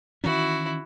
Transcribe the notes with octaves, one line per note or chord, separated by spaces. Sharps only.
D#3 E3 C#4 E4 F#4